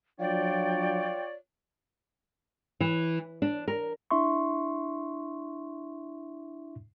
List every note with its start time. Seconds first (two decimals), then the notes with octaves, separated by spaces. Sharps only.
0.20 F3 F#3 D4 F4 C#5 D5 G5
2.80 E3
3.42 D4
3.68 A#4
4.11 D4 E4 E5 C6 C#6